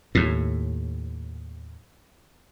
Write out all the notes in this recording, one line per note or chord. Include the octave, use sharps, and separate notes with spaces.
D#2 A2